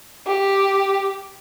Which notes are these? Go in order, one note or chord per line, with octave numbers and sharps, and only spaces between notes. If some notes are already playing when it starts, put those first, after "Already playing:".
G4